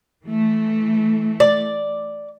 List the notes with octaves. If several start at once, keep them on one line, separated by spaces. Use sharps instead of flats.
E3 A3
D5